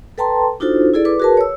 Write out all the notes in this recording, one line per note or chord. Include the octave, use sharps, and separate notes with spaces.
A4 B4 G5 A5 A#5 C6
D4 D#4 F4 F#4 A4 C5
E4 G#4 A4 D5
B4 D6
F#4 G#4 A#4 B4 A5
C#5 E6